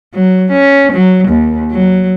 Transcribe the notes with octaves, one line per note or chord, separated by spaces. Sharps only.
F#3
C#4
F#3
D#2
F#3